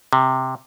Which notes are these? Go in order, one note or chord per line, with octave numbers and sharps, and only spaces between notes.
C3